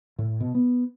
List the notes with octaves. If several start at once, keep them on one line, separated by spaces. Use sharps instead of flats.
A2
B2
B3